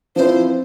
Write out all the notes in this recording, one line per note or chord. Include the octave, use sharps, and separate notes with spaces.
F3 C4 E4 B4 C5